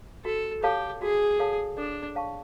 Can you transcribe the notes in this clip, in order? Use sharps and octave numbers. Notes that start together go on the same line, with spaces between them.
F#4 A4
G4 A4 C#5 F5 A5
F#4 G#4
A4 C#5 F5 A5
D4 A4
C#5 F5 A5 C#6